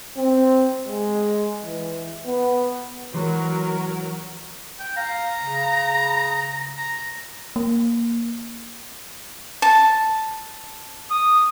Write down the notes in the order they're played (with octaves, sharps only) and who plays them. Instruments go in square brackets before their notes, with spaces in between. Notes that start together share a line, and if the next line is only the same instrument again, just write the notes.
[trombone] C4
G#3
E3
B3
[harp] E3 G#3 C6 [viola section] F#3 A#4
[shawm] G5
[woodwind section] F5 [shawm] A#5
[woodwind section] C#3
[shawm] A#5
[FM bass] A#3
[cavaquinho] A5
[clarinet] D#6